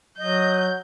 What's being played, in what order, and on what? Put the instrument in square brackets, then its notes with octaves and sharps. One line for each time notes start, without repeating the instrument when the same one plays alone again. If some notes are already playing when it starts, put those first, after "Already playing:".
[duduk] F#3 [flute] D#5 [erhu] G6